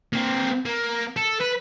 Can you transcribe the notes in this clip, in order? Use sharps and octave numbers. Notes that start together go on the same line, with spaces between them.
A#3 C4
A#3
A4
B4